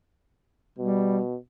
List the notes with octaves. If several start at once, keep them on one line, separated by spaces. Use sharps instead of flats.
B2 G3